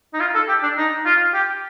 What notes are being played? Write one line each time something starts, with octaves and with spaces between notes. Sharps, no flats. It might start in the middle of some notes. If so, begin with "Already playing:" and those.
D#4
F4
A4
G4
D4
D#4
F4
G4